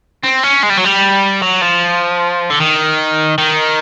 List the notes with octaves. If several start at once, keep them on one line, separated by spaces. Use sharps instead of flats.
C4
C#4
G#3
G3
F#3
G3
F#3
F3
D3
D#3
D#3